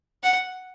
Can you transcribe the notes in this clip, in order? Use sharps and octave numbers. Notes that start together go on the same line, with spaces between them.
F#5